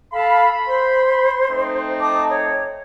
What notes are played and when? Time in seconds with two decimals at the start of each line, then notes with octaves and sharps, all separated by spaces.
0.13 A4 F5 A5 B5
0.67 C5 C6
1.50 A3 C4 D#4
2.00 A5 D6 D#6
2.30 C#5